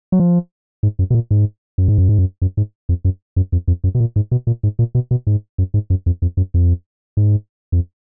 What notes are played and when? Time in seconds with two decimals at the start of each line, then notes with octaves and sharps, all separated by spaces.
0.12 F#3
0.20 F3
0.83 G#2
0.99 F#2
1.10 B2
1.15 A#2
1.31 G#2
1.78 F#2
1.88 G#2
1.98 F#2
2.09 G#2
2.19 F#2
2.42 F#2
2.57 G#2
2.89 F2
3.05 F#2
3.36 F#2
3.52 F2
3.68 F2
3.84 F#2
3.95 B2
4.00 A#2
4.16 G#2
4.31 B2
4.47 A#2
4.63 G#2
4.79 A#2
4.95 B2
5.11 B2
5.27 G#2
5.58 F#2
5.74 G#2
5.90 F#2
6.06 F2
6.22 F2
6.37 F#2
6.54 F2
7.17 G#2
7.72 F2